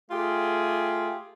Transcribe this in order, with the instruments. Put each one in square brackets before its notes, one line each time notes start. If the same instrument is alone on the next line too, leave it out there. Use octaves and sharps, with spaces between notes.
[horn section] A3 F4 G4 G#4